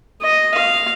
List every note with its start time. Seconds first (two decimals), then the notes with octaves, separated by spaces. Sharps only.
0.23 D#5
0.55 F5